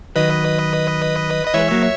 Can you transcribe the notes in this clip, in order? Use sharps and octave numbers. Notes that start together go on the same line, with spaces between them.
D#3 F#3 B4 D#5
D#5
E3 G#3 C#5 E5
F#3 A#3